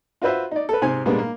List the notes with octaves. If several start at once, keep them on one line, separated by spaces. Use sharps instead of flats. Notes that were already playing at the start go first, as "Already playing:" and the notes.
F4 F#4 B4 C5 E5
D#4 D5
A4 B4
G#2 C3 C4 G#5
A#2 G3 G#3 B3 D4
A#3